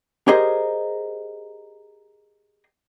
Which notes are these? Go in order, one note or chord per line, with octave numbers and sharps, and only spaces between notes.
G4 G#4 A#4 C5 D#5